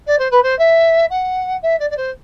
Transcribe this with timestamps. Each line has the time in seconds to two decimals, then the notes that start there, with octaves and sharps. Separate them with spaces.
0.06 D5
0.18 C5
0.31 B4
0.42 C5
0.58 E5
1.10 F#5
1.62 E5
1.79 D5
1.90 D5
1.96 C5